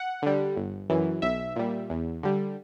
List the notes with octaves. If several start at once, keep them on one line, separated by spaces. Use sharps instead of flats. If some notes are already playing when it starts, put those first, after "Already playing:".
Already playing: F#5
D3 G3
G1
F#2 E3
B1 E5
A#2 G3
E2
D3 G3